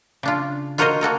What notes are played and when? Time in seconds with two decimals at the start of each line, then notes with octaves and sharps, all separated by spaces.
0.23 C#3 D4 F4
0.78 F4 F#4 A#4 C5 C#5 D#5
1.01 A#3 F#4 A4 A#4